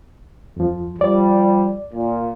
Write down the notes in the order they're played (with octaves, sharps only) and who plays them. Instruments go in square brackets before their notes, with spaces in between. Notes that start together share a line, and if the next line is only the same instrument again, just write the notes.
[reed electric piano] F2 F3
[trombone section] F3 G3 [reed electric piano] D5
[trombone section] A#2